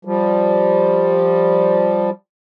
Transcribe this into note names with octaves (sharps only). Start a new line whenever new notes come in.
F3 G3